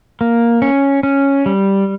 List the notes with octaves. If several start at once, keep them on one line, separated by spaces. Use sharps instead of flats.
A#3
C#4
C#4
G3